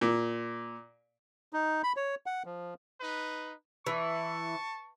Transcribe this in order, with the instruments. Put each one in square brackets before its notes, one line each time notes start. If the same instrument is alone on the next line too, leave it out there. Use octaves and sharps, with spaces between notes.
[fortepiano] A#2
[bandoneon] D#4
B5
C#5
F#5
F3
[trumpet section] D#4 B4
[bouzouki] E3 [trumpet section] A5 C#6